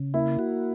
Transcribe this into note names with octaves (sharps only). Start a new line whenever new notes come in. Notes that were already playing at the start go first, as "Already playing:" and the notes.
Already playing: C#3
A#3 E4
F#4